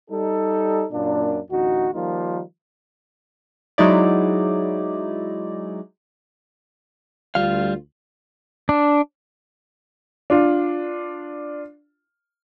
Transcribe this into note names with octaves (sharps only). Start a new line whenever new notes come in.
G3 D#4 A4
F#2 A#2 A#3 D4
A1 D2 D#4 F#4
D#3 F3 G3 A#3 D#4 F4
F#3 G#3 D#4 E4 D5
D2 G3 F4 F5
D4
D4 F4